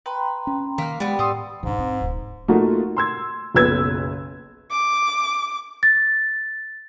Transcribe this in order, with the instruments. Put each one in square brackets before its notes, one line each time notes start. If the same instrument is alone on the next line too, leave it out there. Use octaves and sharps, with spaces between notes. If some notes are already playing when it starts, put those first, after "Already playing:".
[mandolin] B4 [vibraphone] G5 A#5 C6
[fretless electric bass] C#4
[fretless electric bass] D#3 [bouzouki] A#3 [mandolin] E5 F6
[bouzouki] G3 B3 [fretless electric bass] G#3
[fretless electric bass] A2 [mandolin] A4 C6 D#6
[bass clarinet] G#2 [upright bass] D3 D4
[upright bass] C4
D1
[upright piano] A3 A#3 D#4 F4 F#4
C6 E6 G#6
F#1 B1 B4 E6 G#6
[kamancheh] D6
[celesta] A6